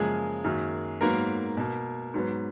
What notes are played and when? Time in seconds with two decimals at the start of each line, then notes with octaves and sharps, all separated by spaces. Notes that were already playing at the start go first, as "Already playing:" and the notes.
Already playing: F#2 C#3 F3 G#3 A#3 G#4
0.44 F#2 D#3 F#3 A#3
1.01 G#2 F#3 A#3 B3 A#4
1.57 B2 A#3
2.14 G#2 F#3 B3